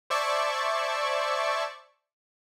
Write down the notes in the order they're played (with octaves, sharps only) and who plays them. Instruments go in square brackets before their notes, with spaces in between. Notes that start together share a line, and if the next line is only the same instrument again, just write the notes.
[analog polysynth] C5 D5 E5 A5 C#6 G#6